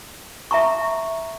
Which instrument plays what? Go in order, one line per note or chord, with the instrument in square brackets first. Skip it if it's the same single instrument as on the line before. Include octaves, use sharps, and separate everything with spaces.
[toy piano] E5 A#5 C#6